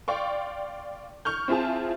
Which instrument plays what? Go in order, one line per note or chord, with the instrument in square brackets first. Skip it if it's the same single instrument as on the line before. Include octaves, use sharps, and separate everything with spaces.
[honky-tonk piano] D5 F5 G5 C6 C#6
C#6 F6 G6
C4 E4 F4 G#4 A5